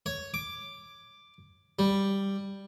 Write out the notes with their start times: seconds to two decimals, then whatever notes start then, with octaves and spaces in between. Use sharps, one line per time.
0.06 C#5
0.34 D6
1.79 G3